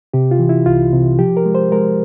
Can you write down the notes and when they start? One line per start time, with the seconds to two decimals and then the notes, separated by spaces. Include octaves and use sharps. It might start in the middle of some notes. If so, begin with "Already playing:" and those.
0.14 C3 G4
0.31 F4
0.39 E3
0.49 E4
0.66 C2 F4
0.93 C3
1.19 F3 G4
1.37 A#4
1.45 G#3
1.55 C5
1.72 G#3 A#4